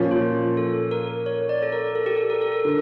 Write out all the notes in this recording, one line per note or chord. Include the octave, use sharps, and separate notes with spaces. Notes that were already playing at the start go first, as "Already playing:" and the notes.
Already playing: A#2 F3 C#4
F4
A4
A#4
C#5
D5
A4
A#4
A4
G4
A4
A#4
A4
A#4
D3 A4